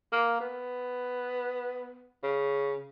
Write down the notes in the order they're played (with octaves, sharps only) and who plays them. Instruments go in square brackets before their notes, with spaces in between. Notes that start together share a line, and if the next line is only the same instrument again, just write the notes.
[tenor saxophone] A#3
B3
C#3